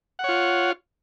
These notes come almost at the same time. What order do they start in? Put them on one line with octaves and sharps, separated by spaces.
F#5 C#5 F4